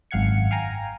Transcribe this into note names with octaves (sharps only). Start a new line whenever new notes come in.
G#1 F#2 F5 F#5 G#6 C#7
F5 G5 G#5 A#5